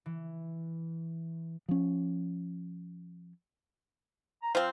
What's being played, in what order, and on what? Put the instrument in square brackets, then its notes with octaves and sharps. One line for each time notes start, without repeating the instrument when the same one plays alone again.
[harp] E3
[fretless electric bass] F3 C#4
[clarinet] A#5
[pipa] F3 C4 [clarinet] F5